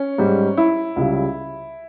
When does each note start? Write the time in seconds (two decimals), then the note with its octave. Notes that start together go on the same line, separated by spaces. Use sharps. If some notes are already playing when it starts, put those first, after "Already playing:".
Already playing: C#4
0.18 G#2 G3
0.57 E4
0.96 C#2 C#3 G3